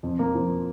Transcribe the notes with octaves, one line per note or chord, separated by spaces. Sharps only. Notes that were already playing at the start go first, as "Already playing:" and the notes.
F2
A#3
F3